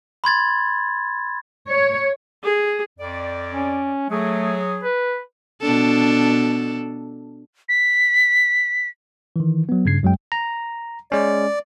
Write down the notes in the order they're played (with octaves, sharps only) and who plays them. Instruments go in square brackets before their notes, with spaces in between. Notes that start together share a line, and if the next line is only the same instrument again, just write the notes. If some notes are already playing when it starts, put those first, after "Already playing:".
[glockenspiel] B5 C6 G#6 A6
[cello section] C#5
[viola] G#4
[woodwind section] F2 D5
[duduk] C#4
[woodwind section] F#3 G#4 [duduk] A3
[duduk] B4
[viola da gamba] B2 D4 A4
[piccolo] B6
[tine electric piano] D#3 E3
F#3 B3
G2 C#3 G#6 C7
F#2 F#3 G#3 G5
A#5
[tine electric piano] G#3 C#4 [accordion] D5